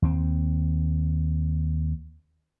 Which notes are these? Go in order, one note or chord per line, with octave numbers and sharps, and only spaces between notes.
D#2 C4